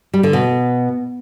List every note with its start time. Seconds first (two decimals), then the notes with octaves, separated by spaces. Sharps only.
0.14 G3
0.23 D3
0.33 B2